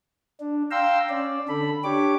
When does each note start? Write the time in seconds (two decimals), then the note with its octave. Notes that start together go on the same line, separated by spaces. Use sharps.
0.40 D4
0.71 F5 G5 A#5 C6 E6
1.10 C#4 D5
1.48 D3 A4 B5
1.84 D4 G4 C#5 D6